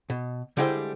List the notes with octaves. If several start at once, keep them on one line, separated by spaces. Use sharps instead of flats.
B2
D3 G3 G#3 E4 C5 G5